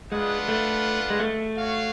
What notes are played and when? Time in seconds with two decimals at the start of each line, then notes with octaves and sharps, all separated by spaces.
0.12 G#3 D4 F4 B4 F#5
0.48 A3
1.10 G#3
1.20 A3
1.56 F#4 C#5 F5